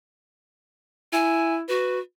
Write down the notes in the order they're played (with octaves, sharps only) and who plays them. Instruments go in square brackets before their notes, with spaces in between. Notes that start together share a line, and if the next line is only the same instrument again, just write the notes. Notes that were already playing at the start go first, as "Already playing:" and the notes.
[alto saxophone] E4 [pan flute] G#5
[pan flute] F#4 [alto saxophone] B4